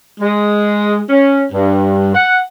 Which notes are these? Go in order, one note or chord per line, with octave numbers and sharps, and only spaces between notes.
G#3
C#4
G2
F#5